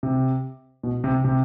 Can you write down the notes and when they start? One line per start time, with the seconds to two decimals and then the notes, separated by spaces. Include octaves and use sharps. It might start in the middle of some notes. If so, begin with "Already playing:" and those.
0.03 C3
0.83 B2
1.04 C3
1.25 C3